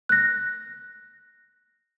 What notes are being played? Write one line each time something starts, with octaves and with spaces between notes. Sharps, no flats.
F#6 A#6